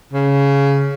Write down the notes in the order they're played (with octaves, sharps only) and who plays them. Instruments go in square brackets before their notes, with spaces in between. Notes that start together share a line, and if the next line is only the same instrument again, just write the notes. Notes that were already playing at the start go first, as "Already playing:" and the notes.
[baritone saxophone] C#3